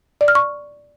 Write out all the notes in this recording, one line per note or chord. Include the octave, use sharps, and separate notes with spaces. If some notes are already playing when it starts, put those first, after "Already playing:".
D5
F6
C#6